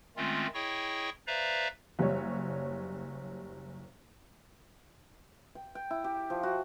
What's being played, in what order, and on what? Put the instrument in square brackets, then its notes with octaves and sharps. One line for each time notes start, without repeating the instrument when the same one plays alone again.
[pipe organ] D#3 G#3 A3 C4 C#4 F4
E4 G#4 C#5 D#5 G5 C#6
B4 C5 D5 E5 F5 A#5
[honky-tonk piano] F#1 G3 C#5
[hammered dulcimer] G5
G5
E4
G4
F3
F#4